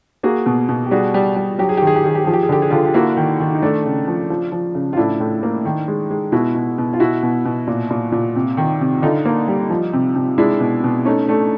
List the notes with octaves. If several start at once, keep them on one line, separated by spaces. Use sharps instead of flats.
A#3 F#4 G#4
B2
B2
G4
G3 F#4 G#4
G3
G3
F#3 G4
G#4
G4
D#3
G#4
G4
D#3 G#4
G4
F3 G#4
G4
G#4
D3 G4
G#4
D3 F4 G4
G4
A#3 E4 F#4
D#3
D#3
D#4
A3 D4
C#3
F3
F3
F3
C#3
F4
A2 D4 E4
A2
A#3
D#3
G#3
G#3
B2 E4 F#4
B2
B2
F4
B2 E4 F#4
B2
B2
A#2
A#2
A#2
C3
D#3
C3
D3 D#4 F4
A#3
G3
F3
C3
C3
G#3 D4 E4
B2
B2
A3 C#4 D#4
A3 D4